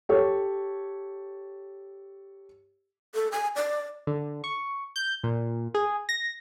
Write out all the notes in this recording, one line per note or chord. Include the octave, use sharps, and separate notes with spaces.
G4 A4 C#5
A4
G#5
D5
D3
C#6
G6
A#2
G#4
A#6